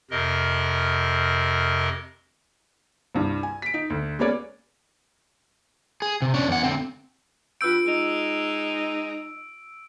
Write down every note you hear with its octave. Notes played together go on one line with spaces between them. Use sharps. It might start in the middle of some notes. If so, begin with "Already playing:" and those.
F2 C3 A#4 D#5
C2 G2
G#5
B6 D7
D#4
D2
G#3 A#3 B3 C#4 C#5 D5
G#4
C3
C#4 D4
E2 F#5
D3 C4
G2 F4 B4 E6 G6 D7
G#3 D#4